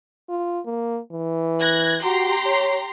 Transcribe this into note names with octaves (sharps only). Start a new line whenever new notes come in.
F4
A#3
E3
F#6 G#6 A#6
F#4 G4 A#5 C6
C#5